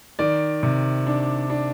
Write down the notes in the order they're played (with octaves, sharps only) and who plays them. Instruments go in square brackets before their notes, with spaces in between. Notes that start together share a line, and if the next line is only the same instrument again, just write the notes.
[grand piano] D#3 D5
C3
D4
D4